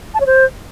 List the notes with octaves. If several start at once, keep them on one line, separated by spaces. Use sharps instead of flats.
A5
C#5
C5